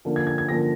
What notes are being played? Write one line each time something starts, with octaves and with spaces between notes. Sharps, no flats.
D3 F3 A#3
G#6
G#6
G#6
D3 F3 A#3 A#6